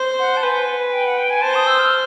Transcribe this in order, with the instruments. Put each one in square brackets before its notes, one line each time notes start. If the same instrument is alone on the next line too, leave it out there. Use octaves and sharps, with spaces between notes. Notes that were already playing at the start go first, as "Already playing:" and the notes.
Already playing: [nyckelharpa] C5
[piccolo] F#5
A5
[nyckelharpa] B4 [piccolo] G#5
[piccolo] G5
F#5
G5
G#5
[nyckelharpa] C5 [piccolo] A5
[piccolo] D#6
E6
F6